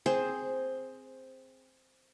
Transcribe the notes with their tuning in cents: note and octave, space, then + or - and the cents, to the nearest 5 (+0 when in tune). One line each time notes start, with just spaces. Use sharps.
C4 +0 G#4 +0 C5 +5